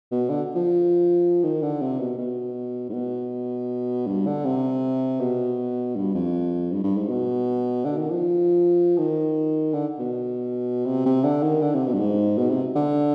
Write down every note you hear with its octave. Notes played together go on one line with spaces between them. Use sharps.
B2
D3
F3
D#3
D3
C3
B2
B2
G#2
B2
G2
D3
C3
B2
G2
F2
G2
G2
G#2
B2
D3
D#3
F3
D#3
D3
B2
C3
C3
D3
D#3
D3
C3
B2
G2
G#2
B2
C3
D3